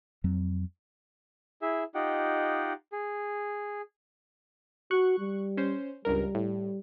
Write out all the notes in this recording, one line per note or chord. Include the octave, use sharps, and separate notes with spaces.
F2 F#3 C4
E4 G#4 E5
D#4 F4 G4 D#5 F#5 G5
G#4
F#4 C#6 F#6
G3
C#4 C5
C#2 G2 G3 A#4
A2